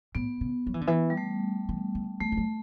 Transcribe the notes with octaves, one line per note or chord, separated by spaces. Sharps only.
A2 B3
C#3
F#3
E3
D3
E3
G3
A3
E3
D3
E3 A3
G3
F#3